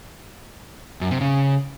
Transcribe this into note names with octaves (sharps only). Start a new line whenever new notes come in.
F#2
C3
C#3